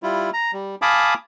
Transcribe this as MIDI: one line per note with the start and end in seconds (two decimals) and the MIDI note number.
0.03 0.30 55
0.03 0.30 64
0.03 0.30 65
0.33 0.51 82
0.53 0.75 55
0.82 1.14 77
0.82 1.14 80
0.82 1.14 81
0.82 1.14 83
0.82 1.14 86
0.82 1.14 87